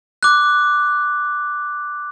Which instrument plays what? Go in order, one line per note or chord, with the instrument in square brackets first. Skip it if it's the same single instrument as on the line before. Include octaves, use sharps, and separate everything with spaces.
[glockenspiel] D6 F#6